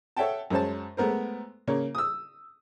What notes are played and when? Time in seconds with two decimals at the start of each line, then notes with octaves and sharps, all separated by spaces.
0.17 A4 C#5 E5 F#5 G5 A5
0.50 F#2 G#3 C5 C#5 A5
0.97 G#3 A3 B3 A#4 C5
1.67 C#3 A#3 C#5
1.95 D#6 E6